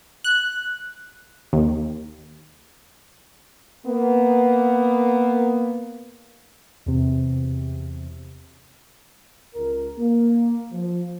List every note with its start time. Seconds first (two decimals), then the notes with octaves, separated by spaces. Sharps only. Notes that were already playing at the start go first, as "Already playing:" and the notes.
0.24 F#6
1.53 D#2
3.86 A#3 B3
6.86 E2 C3
9.55 C#2 A#4
9.98 A#3
10.71 F3